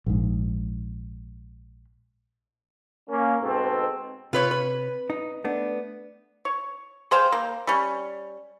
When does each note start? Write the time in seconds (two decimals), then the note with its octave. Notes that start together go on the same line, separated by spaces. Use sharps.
0.06 A#1 G#2
3.10 A#3 C#4
3.42 G#2 B2 C4 A4
4.33 C3 F4 B4 C#5
4.51 B4
5.10 D#4
5.44 A3 B3 D4
6.45 C#5
7.11 G#4 C5 F5 G5
7.32 A#3
7.67 G3 C#4